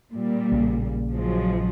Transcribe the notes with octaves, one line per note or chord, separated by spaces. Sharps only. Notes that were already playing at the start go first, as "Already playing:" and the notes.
A#2 G3
A#1 C#3
F3 F#3 G#3